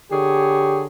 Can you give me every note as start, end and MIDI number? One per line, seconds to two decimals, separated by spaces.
0.12 0.86 50
0.12 0.87 67
0.12 0.86 68
0.12 0.86 73